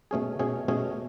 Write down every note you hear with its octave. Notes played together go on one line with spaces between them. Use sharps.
B2 A3 C#4 G#4
B2 A3 C#4 G#4
B2 A3 C#4 G#4